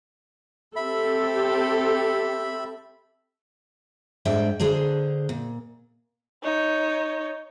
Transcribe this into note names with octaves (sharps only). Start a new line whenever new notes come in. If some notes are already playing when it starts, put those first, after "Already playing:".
C4 G4 A4 E5 B5
G#2 G3 G#3 D4 E5 G5
D3 D4 G#4 C5 A#5
A#2
D#4 C#5